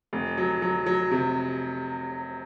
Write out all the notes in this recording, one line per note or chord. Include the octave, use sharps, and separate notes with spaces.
F1
F#3
F#3
F#3
C3